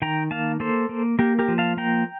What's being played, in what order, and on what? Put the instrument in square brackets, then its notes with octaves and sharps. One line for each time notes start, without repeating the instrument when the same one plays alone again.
[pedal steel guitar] D#3 G5 A#5
A#3 F5 A5
A#3 A4 C5
A#3
A#3 G4 A#4
G4 A#4
F3
F5 A5
A#3 G5 A#5